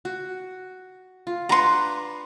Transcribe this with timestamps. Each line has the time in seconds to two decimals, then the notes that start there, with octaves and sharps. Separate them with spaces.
0.05 F#4
1.27 F4
1.49 D4 B4 A#5 C6 C#6